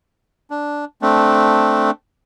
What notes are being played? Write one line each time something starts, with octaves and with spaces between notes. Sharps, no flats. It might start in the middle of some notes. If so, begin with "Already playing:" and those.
D4
A3 C4 D4